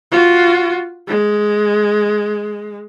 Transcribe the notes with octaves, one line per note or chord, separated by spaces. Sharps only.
F4 F#4
G#3